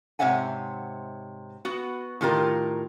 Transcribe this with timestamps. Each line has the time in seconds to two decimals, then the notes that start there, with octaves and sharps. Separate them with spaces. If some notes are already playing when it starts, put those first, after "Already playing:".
0.19 G#2 C3 C#5 E5 F#5 G#5
1.65 B3 F#4
2.21 A2 D#3 F4 G4 A#4